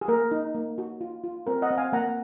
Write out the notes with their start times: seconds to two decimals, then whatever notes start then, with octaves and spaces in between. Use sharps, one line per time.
0.01 G#4
0.08 A#3 A#4
0.31 D#4
0.55 A#3
0.78 F#4
1.01 F4
1.24 F4
1.47 C4 A#4
1.62 D#5 F#5
1.71 C4
1.77 F5 G#5
1.93 A#3 F#5 A#5